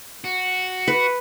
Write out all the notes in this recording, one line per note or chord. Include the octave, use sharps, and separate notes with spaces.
F#4
B4